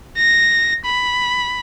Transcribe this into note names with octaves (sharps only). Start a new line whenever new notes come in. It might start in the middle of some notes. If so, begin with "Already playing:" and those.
A#6
B5